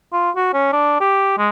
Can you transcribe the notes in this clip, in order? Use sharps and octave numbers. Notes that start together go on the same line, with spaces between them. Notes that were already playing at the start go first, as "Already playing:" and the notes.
F4
F#4
C#4
D4
G4
G#3